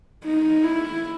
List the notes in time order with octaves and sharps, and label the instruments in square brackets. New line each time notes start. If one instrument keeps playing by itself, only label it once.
[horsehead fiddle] D#4
E4